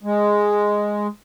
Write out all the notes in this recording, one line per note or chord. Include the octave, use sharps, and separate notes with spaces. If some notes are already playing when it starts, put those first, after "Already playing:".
G#3